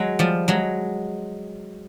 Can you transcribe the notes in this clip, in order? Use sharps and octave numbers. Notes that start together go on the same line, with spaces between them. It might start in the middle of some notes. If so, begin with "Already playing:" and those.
Already playing: F#3 G#3
F3 G3
F#3 G#3